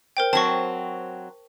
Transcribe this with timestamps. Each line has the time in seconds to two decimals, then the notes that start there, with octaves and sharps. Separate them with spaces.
0.17 A#4 C5 G5
0.33 F#3 C4 A5 C#6